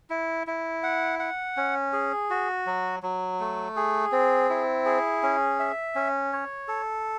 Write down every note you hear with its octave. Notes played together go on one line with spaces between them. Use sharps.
E4
E4
F#5
F#5
C#4
G#4
F#4
F#3
F#3
A3
G#4
C4
E4
G#4
C#4
E5
C#4
C#5
A4